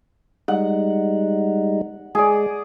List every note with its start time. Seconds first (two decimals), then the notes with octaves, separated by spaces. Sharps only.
0.48 G3 G#3 D#4 F#5
2.15 G#3 G#4 D5